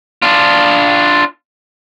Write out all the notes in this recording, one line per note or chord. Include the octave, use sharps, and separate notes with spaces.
D4 F4